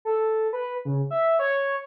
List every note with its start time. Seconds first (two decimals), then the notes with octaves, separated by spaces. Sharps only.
0.05 A4
0.53 B4
0.85 C#3
1.11 E5
1.39 C#5